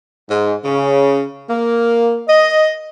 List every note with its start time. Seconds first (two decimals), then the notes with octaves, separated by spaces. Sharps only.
0.30 G#2
0.64 C#3
1.50 A#3
2.28 D#5